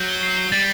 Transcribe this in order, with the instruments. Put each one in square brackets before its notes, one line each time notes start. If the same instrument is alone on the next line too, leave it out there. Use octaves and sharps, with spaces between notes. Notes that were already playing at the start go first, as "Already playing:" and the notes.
Already playing: [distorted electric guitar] F#3 [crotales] G6
[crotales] G7
C7
G7
[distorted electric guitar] G3 [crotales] A6